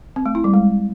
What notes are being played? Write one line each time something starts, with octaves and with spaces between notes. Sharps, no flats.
C4
A3
E4
G3
G#3